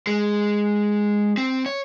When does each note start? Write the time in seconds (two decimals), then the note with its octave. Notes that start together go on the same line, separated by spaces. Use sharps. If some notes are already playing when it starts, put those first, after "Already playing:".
0.07 G#3
1.37 C4
1.66 C#5